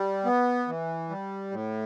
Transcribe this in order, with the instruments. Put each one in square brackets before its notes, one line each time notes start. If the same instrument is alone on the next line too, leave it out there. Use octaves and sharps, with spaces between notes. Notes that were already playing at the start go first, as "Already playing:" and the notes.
Already playing: [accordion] G3
B3
E3
G3
A2